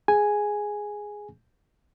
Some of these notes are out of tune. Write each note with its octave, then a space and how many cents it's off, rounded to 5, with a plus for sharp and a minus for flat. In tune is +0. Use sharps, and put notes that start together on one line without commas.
G#4 +0 G#5 +0